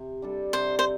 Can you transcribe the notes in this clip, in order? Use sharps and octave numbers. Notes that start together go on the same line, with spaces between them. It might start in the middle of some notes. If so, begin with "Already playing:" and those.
Already playing: C3
G3 D4 A4
C3 C5
C5